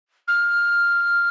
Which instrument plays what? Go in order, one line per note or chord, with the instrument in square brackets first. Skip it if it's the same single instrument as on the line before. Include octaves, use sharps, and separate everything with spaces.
[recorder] F6